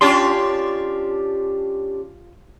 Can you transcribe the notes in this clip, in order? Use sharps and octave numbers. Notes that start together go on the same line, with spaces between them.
C#4 D4 F4 G4 A5 C6